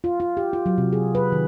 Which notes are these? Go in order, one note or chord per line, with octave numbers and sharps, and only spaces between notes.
F4
F4
G4
F4
F#3
C3
G#4
B4
D#3